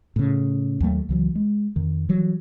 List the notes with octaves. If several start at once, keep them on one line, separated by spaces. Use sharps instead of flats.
A2 C#3
D#2 F#3 A3
C#2 E3 F#3
G#3
F2 D#3
E3 F#3 G3